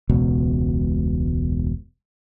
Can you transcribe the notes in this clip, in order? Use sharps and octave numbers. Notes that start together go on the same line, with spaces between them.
E1 C#2 B2